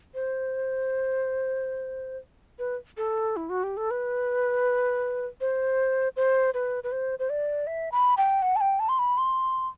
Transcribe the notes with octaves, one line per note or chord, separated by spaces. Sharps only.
C5
B4
A4
E4
F#4
G4
A4
B4
C5
C5
B4
B4
C5
C5
D5
E5
B5
G5
F#5
A5
G5
A5
C6
B5
C6